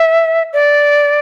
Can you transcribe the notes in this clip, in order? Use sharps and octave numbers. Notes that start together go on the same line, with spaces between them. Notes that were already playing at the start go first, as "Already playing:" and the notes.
Already playing: E5
D5